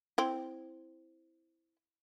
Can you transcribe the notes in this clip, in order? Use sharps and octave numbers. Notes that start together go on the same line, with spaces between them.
C4 E4